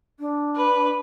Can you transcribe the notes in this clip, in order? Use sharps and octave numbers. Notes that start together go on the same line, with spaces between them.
D4
B4